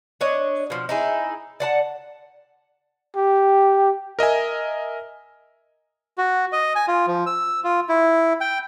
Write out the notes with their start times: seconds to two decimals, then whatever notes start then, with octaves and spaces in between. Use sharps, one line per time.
0.21 D4 C#5 D#5
0.70 B2 F3
0.89 D#4 E4 G#4
1.60 D5 F#5 A5
3.17 G4
4.19 A#4 D#5 E5 G#5
6.18 F#4
6.52 D#5
6.75 G#5
6.88 F4
7.07 F3
7.26 E6
7.64 F4
7.89 E4
8.41 G5